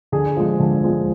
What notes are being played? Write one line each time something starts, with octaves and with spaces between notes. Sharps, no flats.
D3 G#4
F3 G#3
D3
F3 G#3